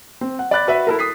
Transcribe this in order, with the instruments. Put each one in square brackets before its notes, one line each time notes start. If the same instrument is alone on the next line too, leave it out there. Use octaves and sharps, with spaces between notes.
[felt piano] C4
F#5
D5 B5 F#6 A6
F#4 B4 E5
E4 A4 A#4
D#6 B6 C7